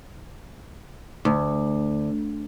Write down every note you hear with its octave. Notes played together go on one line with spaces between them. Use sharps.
D2